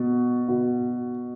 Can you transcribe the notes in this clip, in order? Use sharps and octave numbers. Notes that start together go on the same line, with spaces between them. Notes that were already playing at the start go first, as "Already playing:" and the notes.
Already playing: B2
B2